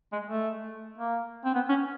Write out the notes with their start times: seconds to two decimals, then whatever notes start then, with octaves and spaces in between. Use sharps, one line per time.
0.12 G#3
0.27 A3
0.98 A#3
1.45 C4
1.55 B3
1.69 C#4